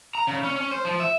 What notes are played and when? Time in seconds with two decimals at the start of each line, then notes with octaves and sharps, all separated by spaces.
0.15 A#5
0.27 C#3
0.45 C#4
0.56 C#4
0.71 C5
0.85 F3
1.00 E5